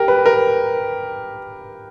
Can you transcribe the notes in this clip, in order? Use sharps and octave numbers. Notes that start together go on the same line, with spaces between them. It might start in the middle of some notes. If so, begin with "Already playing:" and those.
Already playing: G4 A#4
B4
A#4